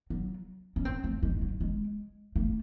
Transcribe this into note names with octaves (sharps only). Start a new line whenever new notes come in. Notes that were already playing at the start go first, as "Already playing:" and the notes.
F#3
C#4
C4
A3
G#3
F#3
G#3
A3